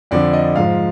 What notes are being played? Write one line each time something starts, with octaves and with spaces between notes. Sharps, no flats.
F2 D3 F3 D5
D#5
G#2 F3 F5